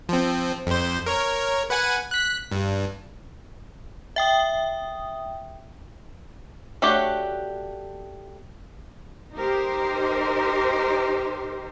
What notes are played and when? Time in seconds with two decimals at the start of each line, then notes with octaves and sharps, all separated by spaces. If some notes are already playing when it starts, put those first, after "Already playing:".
0.09 F3 C4
0.67 F2 C5
1.06 A#4 C#5
1.70 B4 F#5 G#5
2.11 F#6 B6
2.52 G2
4.16 E5 G5 D#6
6.82 A3 D4 F#4 G4 C#5
9.35 D#4 G4 A#4 C5